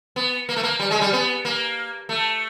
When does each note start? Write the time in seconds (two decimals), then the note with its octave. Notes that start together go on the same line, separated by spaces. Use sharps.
0.16 B3
0.49 A#3
0.56 A3
0.63 A#3
0.80 G3
0.91 G#3
1.01 G3
1.13 B3
1.45 A#3
2.09 A3